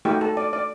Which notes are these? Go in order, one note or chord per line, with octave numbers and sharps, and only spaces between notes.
A3 D#4 F#4 G4
A4
D5
D5